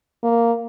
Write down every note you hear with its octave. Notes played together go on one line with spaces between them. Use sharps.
A#3